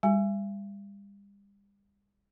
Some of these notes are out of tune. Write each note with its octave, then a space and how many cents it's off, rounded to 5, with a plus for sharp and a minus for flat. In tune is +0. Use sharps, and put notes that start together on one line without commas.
G3 +40 G#5 +0